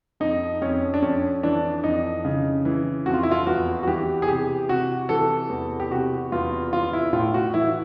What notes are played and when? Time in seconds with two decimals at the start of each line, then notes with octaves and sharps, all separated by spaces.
0.20 F2 D#4
0.61 F2 C#4
0.94 D4
1.02 F2 C#4
1.43 E3 D4
1.84 F2 D#4
2.25 C#3
2.65 E3
3.06 F2 F#4
3.14 F4
3.23 E4
3.31 F4
3.46 E2 F#4
3.83 F#4
3.87 E3 G4
4.22 G#4
4.28 C3 G4
4.69 C3 F#4
5.09 E3 A4
5.50 E2
5.80 G4
5.91 C3 F#4
6.32 E2 F4
6.73 E3 F4
6.93 E4
7.13 A2 F4
7.34 F#4
7.54 E3 E4